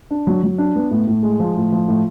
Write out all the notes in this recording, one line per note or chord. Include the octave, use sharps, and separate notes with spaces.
D4
F#3
F#3
D4
B3
A2
A2
G#3
F3
A2
F3
A2